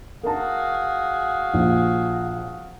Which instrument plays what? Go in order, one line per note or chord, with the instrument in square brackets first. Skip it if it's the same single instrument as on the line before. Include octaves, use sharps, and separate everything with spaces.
[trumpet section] F#4 G#4 F5 [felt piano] A#4 A5
[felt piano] A#1